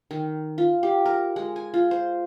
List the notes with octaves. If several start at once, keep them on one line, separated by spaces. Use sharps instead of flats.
D#3
F4
G4
A#4
G#3
G#5
F4
C5